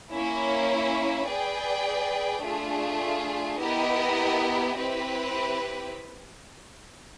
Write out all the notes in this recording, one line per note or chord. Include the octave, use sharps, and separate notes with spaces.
A#3 C#4 E4
G#4 B4 D5 G5
A3 D4 F4 G#4
B3 E4 G4 A#4 D#5
C4 E4 G4 B4